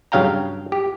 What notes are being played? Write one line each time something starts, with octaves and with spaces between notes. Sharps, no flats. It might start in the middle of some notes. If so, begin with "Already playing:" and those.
G2 C#3 F#3 F5 G5 A#5
G4